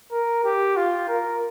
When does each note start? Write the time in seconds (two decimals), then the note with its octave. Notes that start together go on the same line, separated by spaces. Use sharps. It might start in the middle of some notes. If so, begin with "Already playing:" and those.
0.11 A#4
0.44 G4
0.76 F4
1.08 A#4